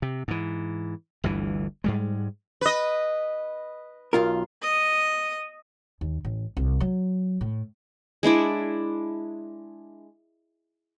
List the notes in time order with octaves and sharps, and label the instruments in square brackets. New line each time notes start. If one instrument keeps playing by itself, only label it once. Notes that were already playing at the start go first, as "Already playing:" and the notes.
[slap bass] C3
G#2 E3
G1 D2 G2 E3
G#2 G3 G#3
[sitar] B4 D#5
[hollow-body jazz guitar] B1 F4 A#4
[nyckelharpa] D#5 D#6
[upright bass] D#2
A1
C2
F#3
A2
[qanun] G#3 D4 E4 D5